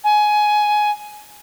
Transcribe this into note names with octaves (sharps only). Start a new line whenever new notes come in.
G#5